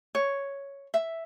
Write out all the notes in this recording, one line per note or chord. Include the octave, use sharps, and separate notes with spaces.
C#5
E5